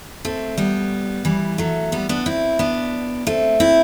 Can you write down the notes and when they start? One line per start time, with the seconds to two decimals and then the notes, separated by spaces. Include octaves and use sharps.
0.25 A3 C4
0.57 G3 B3
1.25 E3 G3
1.58 F#3 A3
1.92 G3 B3
2.09 B3 D4
2.26 C4 E4
2.59 B3 D4
3.27 A3 C4
3.60 C4 E4